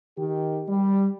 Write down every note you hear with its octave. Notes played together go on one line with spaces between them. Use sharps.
D#3 G4
G3